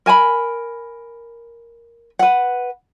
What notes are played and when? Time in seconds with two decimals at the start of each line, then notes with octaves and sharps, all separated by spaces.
0.06 A#4 G#5 A5 B5
2.19 B4 F#5